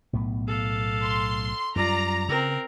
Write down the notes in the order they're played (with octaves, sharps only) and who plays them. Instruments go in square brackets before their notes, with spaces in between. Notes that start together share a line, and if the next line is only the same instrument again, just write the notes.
[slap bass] B1 A2 B3
[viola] A4 F5
[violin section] C6
[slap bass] F#2 G3 [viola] F4 D5 [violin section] A#5
[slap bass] C#3 [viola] C4 A#4